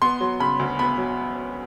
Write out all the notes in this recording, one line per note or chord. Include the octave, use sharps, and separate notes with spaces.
B3 C6
F#3
C#3 B5
D2
B3 B5
F#3